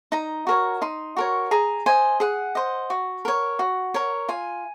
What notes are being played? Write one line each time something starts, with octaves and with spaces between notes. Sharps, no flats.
D#4 A#5
F#4 A#4 C#5
D#4 C6
F#4 A#4 C#5
G#4 A#5
C5 D#5 G#5
G#4 F#5
C5 D#5
F#4
A#4 C#5
F#4
A#4 C#5
F4 G#5